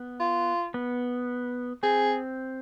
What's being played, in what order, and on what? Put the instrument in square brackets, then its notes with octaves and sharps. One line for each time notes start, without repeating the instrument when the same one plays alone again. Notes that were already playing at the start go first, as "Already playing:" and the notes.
Already playing: [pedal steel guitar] B3
[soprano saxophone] F4
[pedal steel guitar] B3
[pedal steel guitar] C4 [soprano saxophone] G#4